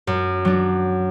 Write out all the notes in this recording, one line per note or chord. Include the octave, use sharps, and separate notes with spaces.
F#2
F#3 D4